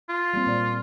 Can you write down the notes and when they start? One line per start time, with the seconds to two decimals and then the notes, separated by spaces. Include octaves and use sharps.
0.09 F4
0.34 G3 A#3 C4
0.47 A#2 D5